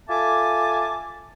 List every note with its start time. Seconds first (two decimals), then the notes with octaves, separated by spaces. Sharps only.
0.09 F4 A4 E5 G#5 A5 D6